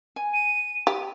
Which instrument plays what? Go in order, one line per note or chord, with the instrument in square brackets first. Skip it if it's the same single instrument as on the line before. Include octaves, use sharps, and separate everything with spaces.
[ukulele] G#5
[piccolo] D#7
[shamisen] G4